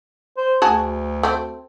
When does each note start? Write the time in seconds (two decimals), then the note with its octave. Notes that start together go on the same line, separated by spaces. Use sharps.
0.37 C5
0.62 D2 F#4 G#4 A5
1.23 A3 C4